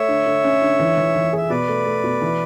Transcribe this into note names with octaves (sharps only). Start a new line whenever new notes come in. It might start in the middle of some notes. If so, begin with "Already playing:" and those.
Already playing: A3 C#5 E5
D3
D3
C#4
D3
E3
E3
E3
G#4 E5
B2 B4 D5
A3
A3
B2
E3